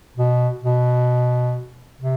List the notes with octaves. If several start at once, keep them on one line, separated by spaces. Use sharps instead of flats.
B2
B2
C3